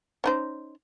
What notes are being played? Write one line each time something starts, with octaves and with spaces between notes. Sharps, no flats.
C#4 D#4 C5